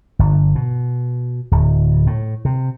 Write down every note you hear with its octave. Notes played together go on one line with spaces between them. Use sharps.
G1
B2
D1
A2
C3